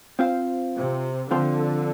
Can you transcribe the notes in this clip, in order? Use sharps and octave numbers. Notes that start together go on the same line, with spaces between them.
C4 F4 C5 F5
C3
D3 F3 C4 F4 A4 C5